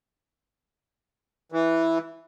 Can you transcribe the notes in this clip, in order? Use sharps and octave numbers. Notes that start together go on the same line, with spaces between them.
E3